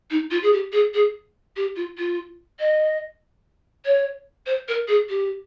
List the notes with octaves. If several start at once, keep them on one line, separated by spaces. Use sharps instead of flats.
D#4
F4
G#4
G4
G#4
G#4
G4
F4
F4
D#5
C#5
C5
A#4
G#4
G4